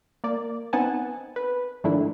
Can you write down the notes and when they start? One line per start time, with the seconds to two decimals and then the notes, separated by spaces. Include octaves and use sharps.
0.24 A#3 D5
0.73 B3 C4 D#4 F#5 G#5 A5
1.36 B4
1.84 G#2 D#3 F3 A3 D4 E4